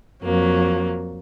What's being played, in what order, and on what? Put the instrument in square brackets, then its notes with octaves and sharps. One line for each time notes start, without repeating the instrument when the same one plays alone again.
[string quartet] F2 F#3 A#3